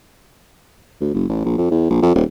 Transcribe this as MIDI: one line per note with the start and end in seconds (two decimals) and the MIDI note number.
1.01 1.14 38
1.14 1.24 30
1.29 1.41 33
1.45 1.53 34
1.58 1.66 41
1.71 1.87 40
1.90 2.01 34
2.02 2.14 41
2.15 2.24 27